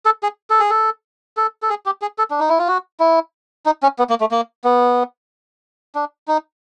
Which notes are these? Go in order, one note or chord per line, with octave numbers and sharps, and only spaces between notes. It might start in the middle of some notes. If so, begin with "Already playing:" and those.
A4
G#4
A4
G#4
A4
A4
A4
G#4
G4
G#4
A4
D4
D#4
E4
F4
F#4
E4
D#4
C#4
B3
A#3
A3
A#3
B3
D4
D#4